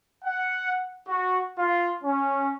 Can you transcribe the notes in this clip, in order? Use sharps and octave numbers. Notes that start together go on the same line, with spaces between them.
F#5
F#4
F4
C#4